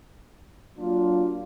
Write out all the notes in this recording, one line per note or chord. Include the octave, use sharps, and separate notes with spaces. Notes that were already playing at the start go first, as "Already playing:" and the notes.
F#3 A#3 D4 F4